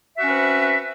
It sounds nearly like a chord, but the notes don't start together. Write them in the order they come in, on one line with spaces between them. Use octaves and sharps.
E5 F#4 C#4 B4 C4